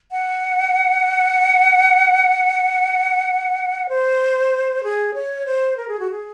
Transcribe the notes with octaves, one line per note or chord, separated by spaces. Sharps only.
F#5
C5
G#4
C#5
C5
A#4
G#4
F#4
G#4